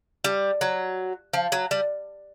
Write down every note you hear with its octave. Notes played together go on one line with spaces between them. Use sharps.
G3
F#3
F3
F#3
G3